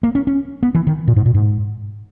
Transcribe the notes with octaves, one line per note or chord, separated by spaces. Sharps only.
A#3
C#4
C#4
B3
E3
D#3
A#2
G#2
A#2
G#2